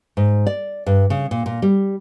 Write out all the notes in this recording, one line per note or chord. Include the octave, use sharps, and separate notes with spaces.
G#2
D5
G2
C#3
A#2
A#2
G3